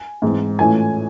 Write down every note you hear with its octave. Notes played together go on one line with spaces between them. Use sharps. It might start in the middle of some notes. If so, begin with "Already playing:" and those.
Already playing: G#5
G#2 E3 G#3 C4
A2 E3 A3 C#4 F4 G#5